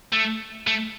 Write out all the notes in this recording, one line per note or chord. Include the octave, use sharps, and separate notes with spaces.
A3
A3